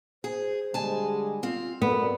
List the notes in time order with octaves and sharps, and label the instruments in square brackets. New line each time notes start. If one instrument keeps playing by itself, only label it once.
[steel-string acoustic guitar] G#4 [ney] C5
[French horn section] D3 G3 G#3 [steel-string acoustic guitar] G#5 A5
[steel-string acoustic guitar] C4 F5 [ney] F4
[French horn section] F#2 A#4 D5 [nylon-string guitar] B3 [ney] A4